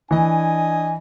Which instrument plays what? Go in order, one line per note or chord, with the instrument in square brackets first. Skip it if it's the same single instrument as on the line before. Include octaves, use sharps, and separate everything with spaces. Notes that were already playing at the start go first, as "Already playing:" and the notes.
[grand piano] E3 [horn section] D4 D#5 G#5